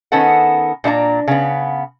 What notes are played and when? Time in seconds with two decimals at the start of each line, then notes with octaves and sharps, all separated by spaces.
0.12 D#3 B3 C#4 A4 F#5
0.84 A#2 D4 E4 A#5
1.28 C#3 B3